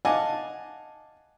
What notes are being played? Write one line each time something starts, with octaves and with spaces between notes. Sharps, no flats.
D#5 F5 F#5 G#5 A5 D6